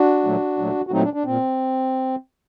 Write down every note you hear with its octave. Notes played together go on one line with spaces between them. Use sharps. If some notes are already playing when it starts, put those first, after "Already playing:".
Already playing: D4 F#4
A#2 F#3 A3
A#2 F#3 A3
F#4
A#2 F#3 A3 C4 D#4
D4
D4
A#2 C4